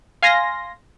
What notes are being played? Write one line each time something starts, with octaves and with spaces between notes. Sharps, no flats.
F5 G#5 C6 A#6